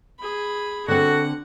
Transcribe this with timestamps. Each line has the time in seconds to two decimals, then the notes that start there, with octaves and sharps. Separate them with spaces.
0.20 G#4 B5
0.88 D3 C4 F#4 A4 F#5